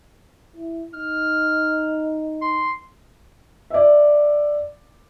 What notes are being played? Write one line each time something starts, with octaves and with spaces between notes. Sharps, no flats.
E4
D#4 F6
C6
D5 E5